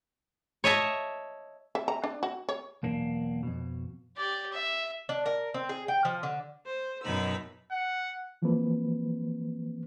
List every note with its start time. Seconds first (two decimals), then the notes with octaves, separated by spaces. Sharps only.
0.64 C#5 D#5 E5 A5
1.75 E5
1.88 A#5
2.04 D4
2.23 F#4
2.49 C#5
2.83 B1 E2 A#3 D4
3.43 F2 B2
4.17 G4 D5
4.52 E5
5.09 D4
5.26 A#4
5.54 C4
5.69 G#4
5.88 G5
6.05 F3
6.23 D3
6.66 C5
7.03 F#2 B2 D#4 B5 E6
7.71 F#5
8.42 E3 F3 G#3 A#3 C4 B4